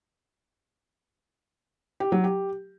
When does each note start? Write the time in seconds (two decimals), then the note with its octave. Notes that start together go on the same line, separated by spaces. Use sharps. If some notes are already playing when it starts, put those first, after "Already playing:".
2.00 G4
2.12 F#3
2.24 G4